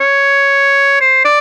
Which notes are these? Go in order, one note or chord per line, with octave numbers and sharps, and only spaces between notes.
C#5
C5
D5